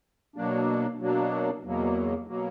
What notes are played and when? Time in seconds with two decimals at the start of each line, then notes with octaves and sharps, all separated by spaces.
0.36 B2 F#3 A#3 D4
1.00 B2 F#3 A#3 D4
1.63 E2 B2 F#3 A#3
2.27 B2 F#3 A#3